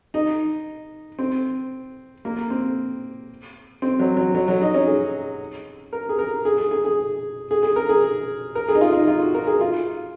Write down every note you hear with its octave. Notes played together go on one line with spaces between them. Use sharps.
D#4
C4
A#3
C4
C4
F#3
F#3
F#3
F#3
D#4
C#4
G#4
A#4
G#4
A#4
G#4
G#4
G#4
G#4
G#4
G#4
A#4
G#4
A#4
G#4
D#4
F4
D#4
F4
F#4
A#4
G#4
F4